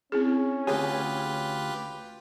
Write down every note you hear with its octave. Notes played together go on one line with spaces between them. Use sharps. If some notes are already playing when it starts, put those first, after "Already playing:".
C4 C#4 E4 G#4
D2 F4 G4 G#4 B4 C#5